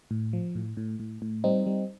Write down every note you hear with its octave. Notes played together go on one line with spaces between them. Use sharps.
A2
F3
A2
A2
A2
A2
G3 C4 D#4
G3